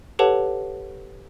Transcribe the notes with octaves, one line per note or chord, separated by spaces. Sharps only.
G4 A4 B4 C#5 F#5 A5